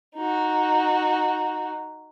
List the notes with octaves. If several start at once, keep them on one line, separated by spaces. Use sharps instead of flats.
D#4 F#4